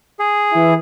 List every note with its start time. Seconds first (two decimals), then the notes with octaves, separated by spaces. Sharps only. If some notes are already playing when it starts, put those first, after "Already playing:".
0.19 G#4
0.51 E3 E4